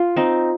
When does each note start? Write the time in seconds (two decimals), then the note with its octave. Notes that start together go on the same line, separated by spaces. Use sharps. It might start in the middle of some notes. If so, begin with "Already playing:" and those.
Already playing: F4
0.16 C4 D#4